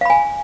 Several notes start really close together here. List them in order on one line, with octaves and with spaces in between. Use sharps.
F5 B5 G#5